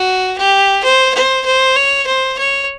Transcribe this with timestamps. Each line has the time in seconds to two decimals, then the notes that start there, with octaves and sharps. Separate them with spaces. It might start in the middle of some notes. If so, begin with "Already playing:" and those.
Already playing: F#4
0.38 G4
0.84 C5
1.14 C5
1.45 C5
1.76 C#5
2.06 C5
2.38 C#5